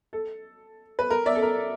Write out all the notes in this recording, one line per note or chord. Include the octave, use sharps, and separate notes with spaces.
A4
B4
A#4
D5 E5
A4
A#4